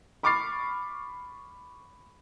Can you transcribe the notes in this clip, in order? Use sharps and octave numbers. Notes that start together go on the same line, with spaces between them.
B5 C#6 D6 F6 A6 C7